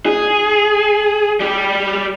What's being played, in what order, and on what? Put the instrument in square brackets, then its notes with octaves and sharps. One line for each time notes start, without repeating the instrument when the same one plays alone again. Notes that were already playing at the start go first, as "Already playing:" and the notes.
[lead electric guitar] G#4
G3 G4